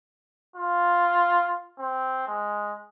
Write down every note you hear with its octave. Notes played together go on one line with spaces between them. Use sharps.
F4
C4
G#3